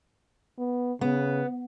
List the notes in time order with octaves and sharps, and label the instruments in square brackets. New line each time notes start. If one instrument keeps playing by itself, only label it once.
[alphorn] B3
[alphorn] C#3 [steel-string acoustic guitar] B3